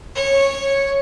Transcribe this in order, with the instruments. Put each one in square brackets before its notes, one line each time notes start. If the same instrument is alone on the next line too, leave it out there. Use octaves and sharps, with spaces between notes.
[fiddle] C#5